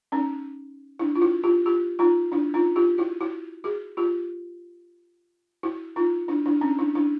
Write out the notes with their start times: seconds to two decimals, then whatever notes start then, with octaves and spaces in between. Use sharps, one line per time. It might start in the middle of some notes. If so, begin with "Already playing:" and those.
0.12 C#4 D#4
0.99 D4 E4
1.15 F4
1.21 E4 F#4
1.44 F4 G4
1.66 F4 G4
1.99 D#4 F4
2.32 D4 E4
2.54 D#4 F4
2.76 F4 G4
2.98 E4 F#4
3.21 E4 F#4
3.64 F#4 G#4
3.97 F4 G4
5.63 E4 F#4
5.96 D#4 F4
6.28 D4 E4
6.46 D4 E4
6.61 C#4 D#4
6.79 D4 E4
6.95 D4 E4